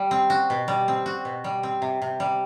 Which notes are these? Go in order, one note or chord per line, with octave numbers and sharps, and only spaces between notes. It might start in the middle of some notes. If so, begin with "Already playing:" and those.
Already playing: G3
C4
F#4
B2
G3
C4
F#4
B2
G3
C4
C3
C3
G3